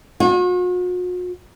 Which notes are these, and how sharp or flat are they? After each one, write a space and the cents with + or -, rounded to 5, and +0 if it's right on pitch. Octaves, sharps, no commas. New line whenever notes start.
F#4 -45